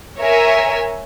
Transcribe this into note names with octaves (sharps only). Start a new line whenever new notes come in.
A#4 C#5 E5 G#5